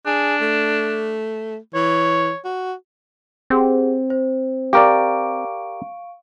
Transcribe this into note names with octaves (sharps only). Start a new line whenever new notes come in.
D4 G#4
A3
E3 C#5
F#4
C4 G4 G#4 F#5
C5
G4 A#4 D5 F5 C#6 D7